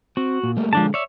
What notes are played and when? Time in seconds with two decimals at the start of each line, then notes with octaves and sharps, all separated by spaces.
0.17 C4 F#4
0.43 A#2
0.57 G3 A3 A#3
0.73 D3 F3 G#3 D4 A5
0.94 C#5 D5 E5